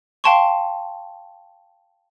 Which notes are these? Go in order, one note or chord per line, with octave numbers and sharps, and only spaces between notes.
F5 G5 A5 C6 C#6